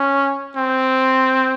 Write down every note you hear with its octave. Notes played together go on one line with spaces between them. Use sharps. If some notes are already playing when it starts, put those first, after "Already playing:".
Already playing: C#4
C4